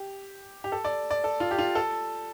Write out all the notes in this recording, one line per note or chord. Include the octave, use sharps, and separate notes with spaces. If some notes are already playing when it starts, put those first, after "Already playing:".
Already playing: G4
G4
A4
D5
D5
A4
F4
G4
F4
A4